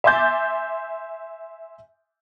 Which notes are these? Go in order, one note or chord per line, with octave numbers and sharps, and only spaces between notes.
E5 G#5 C6 D6 G6 A6